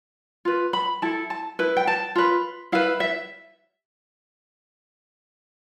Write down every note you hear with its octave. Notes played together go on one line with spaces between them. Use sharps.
F4 B4
B5
E4 A4 A5
A5
E4 B4
G5
A5
F4 B4
E4 B4 F5
E5